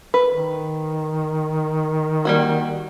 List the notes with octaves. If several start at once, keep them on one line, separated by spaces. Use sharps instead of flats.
B4
D#3
G3 A#3 F#4